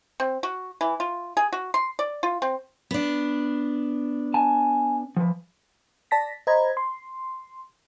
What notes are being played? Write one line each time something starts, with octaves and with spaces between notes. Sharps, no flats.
C4
F#4
E3
F4
G#4
F#4
C6
D5
F4
C4
B3 D4
G#5 A5
F3 B4
D5 A5 A#6 B6
C5 D#5 A#5 B5 G#6
C6